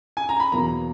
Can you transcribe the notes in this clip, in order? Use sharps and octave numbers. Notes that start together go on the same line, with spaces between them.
G#5
A#5
B5
E2 B2 F#3 A#3 A#5